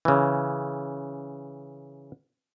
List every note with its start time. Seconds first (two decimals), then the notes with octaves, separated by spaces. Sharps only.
0.05 C#3 E3